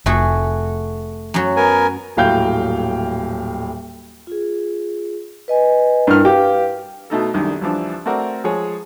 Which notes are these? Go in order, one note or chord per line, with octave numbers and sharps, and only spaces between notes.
F1 A3 F#4 G#4
F#2 F#3
B3 A#4 G#5
D#1 A2 F#3 F5 G5 G6
F4 G#4
B4 D#5 G#5
G2 E4 A#4 F6
G4 B4 F5
B2 A3 D#4 A4
C2 F#2 D#3 D4
C2 E3 F3 D4
A3 C4 F#4 A#4 D5
F3 G#3 G#4 C#5